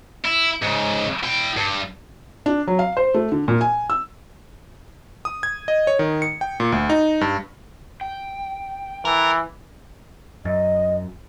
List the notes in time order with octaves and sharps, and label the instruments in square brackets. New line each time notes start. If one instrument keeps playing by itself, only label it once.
[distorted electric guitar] E4
G#2 C#3
E4 G5
G2
[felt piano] D4
F#3
F5
C5
A3
D3
A#2
G#5
E6
[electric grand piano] D#6
G#6
D#5
C#5
D#3
C#7
G5
A#2
D2
D#4
G2
[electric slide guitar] G5
[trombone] E3 [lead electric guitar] A#4
[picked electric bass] F#2 [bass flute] D#5